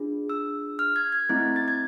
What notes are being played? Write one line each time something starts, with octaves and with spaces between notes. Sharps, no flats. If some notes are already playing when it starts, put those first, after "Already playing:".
Already playing: D4 F4 G#4
E6
F6
G#6
G#6
A3 C4 E4
A6
G#6